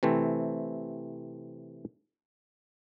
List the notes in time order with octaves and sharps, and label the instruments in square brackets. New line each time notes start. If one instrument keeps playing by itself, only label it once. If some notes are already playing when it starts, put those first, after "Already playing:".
[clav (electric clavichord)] C3 E3 A3 C4